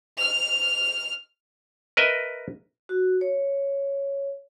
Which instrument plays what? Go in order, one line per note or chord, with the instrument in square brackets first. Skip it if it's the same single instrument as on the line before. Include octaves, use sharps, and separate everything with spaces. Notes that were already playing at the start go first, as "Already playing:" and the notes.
[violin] F6 F7
[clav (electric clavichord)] A#4 B4 D#5 E5
[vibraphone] F#4
C#5